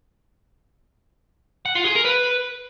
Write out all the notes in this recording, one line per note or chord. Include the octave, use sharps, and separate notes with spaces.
F#5
F4
G#4
A#4
B4